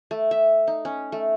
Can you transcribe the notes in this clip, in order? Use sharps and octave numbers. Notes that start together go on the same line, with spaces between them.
A3
E5
D#4
C#4
A3